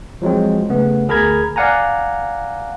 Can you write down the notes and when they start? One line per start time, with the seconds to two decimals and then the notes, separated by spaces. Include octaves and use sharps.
0.22 F3 F#3 G#3 C4
0.70 C#3 A3 B3
1.08 D2 G#4 A#4 A#5 B5 G#6
1.56 D5 F5 F#5 G#5 A#5